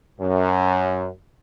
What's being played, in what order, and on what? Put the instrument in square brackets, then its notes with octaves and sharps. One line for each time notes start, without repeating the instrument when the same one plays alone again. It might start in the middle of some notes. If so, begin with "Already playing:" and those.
[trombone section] F#2